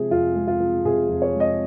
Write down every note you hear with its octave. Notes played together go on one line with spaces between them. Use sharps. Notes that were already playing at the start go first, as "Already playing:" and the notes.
Already playing: C3 F3 G#3 G#4
F2 F4
G#3
F4
F3
C3 G#4
F2
C#5
G#3
D#5